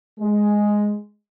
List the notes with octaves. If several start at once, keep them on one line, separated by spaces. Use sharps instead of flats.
G#3